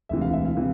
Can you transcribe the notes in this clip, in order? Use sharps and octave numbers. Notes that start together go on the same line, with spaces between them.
E1 D2 C3 E3 E5
F5
E5
F5
C3 E3